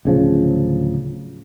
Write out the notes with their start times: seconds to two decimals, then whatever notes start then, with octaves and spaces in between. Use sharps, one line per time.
0.05 D1 C#3 F3